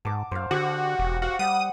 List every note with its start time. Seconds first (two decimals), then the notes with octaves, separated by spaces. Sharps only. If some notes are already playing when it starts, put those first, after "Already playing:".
0.05 G#2 A5 D6
0.31 F#2 C5 F5
0.51 D3 F#4 G4 C5
0.99 E1
1.22 F#4 F5
1.39 G3 F#5 D#6